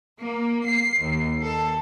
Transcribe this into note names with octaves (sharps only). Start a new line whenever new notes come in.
A#3
C7
D#2
A4